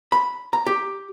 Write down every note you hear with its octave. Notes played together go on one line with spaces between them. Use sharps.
B5
A#5
G4